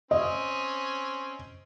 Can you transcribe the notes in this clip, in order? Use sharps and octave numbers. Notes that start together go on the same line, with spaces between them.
C4 C#4 D#5